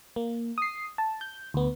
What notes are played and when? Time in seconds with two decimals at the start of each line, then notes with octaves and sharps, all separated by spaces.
0.16 A#3
0.58 D#6 C7
0.98 A5
1.21 G6
1.54 D2 B3